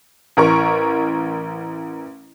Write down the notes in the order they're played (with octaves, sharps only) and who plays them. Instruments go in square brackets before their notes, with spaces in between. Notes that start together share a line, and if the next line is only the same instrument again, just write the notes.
[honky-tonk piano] A1 A#4 C#6